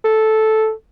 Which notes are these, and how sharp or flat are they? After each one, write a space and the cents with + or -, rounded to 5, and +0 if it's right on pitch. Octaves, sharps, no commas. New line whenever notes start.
A4 -10